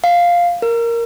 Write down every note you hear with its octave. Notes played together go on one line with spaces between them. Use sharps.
F5
A#4